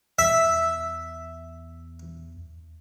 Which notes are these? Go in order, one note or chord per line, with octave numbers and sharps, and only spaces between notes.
E2 E5